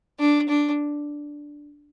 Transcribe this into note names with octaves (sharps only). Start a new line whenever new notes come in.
D4
D4